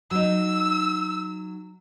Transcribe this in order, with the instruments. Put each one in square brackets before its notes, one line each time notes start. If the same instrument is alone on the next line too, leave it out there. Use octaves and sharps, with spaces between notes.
[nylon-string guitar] F#3 D#4 [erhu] E6